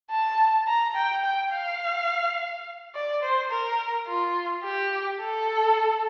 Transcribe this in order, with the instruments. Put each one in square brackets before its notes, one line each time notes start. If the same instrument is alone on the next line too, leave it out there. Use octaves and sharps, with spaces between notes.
[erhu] A5
A#5
G5
G5
F5
D5
C5
A#4
F4
G4
A4